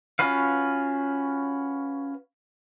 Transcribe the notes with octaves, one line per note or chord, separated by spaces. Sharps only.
C#4 F4 F#4 B4 F5